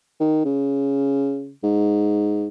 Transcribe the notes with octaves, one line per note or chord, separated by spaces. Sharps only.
D#3
C#3
G#2